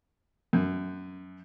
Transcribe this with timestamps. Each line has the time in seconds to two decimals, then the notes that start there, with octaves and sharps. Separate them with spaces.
0.53 F#2